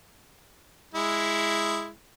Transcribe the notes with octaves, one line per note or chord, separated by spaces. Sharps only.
G#3 E4